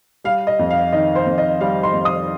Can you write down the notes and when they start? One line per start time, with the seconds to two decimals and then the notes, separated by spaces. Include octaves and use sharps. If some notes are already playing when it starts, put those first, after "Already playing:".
0.24 G3 F5
0.47 D#5
0.59 F2
0.70 F5
0.93 D#3 D#5
1.15 C5
1.26 F2
1.38 D#5
1.60 G3 F5
1.83 C6
1.94 F2
2.05 D#6